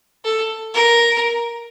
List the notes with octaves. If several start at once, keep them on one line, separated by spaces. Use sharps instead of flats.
A4
A#4